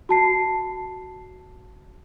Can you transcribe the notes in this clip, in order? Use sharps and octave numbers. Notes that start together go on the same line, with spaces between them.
F#4 A5 C7